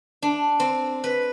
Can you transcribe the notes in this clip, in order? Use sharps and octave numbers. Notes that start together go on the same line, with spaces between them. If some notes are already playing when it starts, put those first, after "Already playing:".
D4
C4
B4